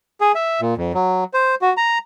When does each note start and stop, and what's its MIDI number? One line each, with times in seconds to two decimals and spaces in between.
0.21 0.32 68
0.35 0.61 76
0.61 0.74 46
0.77 0.92 41
0.94 1.24 54
1.34 1.55 72
1.62 1.73 66
1.77 1.98 82